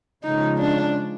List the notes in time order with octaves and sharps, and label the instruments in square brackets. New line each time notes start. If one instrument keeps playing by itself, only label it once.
[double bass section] C#3 F3 G#3 C#4 [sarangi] D#4
[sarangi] D4